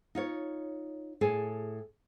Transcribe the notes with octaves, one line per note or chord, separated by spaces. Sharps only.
D#4 F4 C#5
A2 G#4 A4 G#5